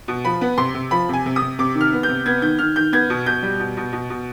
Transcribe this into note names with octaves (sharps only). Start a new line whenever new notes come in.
B2
F3 B5
B3
C3 C6
C3
F3 B5
C3 G#5
C3
D#6
C3
C3 D6
D#3
F6
B3
G6
C3
B3 G#6
D#3 G6
D#3 F6
D#3 G6
B3 G#6
B2
B2 G6
G3
B2
B2
B2
B2